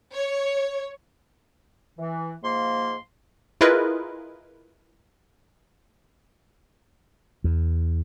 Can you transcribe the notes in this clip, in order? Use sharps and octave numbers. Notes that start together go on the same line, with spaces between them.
C#5
E3
G#2 F3 A#3 C6
E4 F4 G#4 A#4 B4 D#5
E2